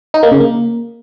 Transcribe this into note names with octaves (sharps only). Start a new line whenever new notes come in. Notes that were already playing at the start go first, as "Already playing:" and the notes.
D#4
A#3
C#3
A#3